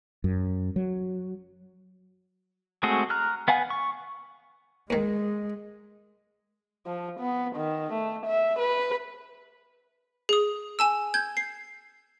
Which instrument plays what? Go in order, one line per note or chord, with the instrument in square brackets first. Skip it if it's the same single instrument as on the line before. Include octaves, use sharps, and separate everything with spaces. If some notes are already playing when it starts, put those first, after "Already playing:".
[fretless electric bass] F#2
F#3
[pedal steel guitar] G#3 A3 C4 F#4 G#4
A#5 F6 F#6
B3 F5 F#5 G#5
C#6
[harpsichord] D#2 D#3 [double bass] G#3
[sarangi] F3
B3
D#3
A3
E5
B4
[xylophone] G#4 D#6
G#5 A5 E6
G6 G#6
C7